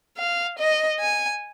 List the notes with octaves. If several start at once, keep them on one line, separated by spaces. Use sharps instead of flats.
F5
D#5
G#5